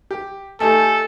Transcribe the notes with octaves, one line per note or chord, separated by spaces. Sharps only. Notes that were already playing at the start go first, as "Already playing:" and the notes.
G4
A3 D#4 G4 A4 G#5